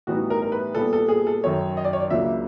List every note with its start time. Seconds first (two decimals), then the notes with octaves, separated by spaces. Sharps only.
0.07 A2 E3 G3 B3 D#4 F#4
0.30 A#4
0.42 A#4
0.52 B4
0.75 A#2 G3 B3 A4
0.93 A4
1.09 G#4
1.27 A4
1.43 F#2 D#3 F#3 C#5
1.77 D#5
1.84 D5
1.93 C#5
2.00 D5
2.10 C#2 C#3 F#3 A#3 D4 E5